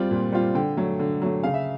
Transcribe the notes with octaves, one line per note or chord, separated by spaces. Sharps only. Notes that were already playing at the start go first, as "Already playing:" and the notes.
Already playing: G3 C4 F4
A#2
G3 C4 F4
D3 G5
F#3 A3
D3
F#3 A3
C#3 F5
E5